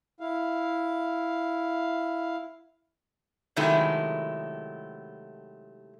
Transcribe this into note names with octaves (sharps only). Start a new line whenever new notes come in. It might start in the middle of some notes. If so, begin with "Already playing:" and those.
E4 F5
C3 D#3 F#3 G#3 A3 E4